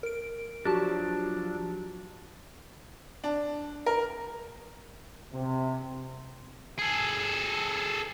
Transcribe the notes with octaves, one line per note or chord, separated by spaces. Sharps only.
A#4 D7
F3 F#3 D4 F#4 G4 A5
D4
A#4
C3
G#4 A4